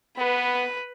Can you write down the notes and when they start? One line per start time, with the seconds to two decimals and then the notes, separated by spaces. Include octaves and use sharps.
0.18 B3 B4